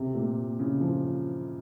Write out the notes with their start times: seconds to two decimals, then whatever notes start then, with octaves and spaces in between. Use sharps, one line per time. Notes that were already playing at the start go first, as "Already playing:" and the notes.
Already playing: C3
0.15 A#2
0.59 C#3
0.80 F3